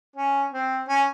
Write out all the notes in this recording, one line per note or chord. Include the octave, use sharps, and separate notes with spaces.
C#4
C4
C#4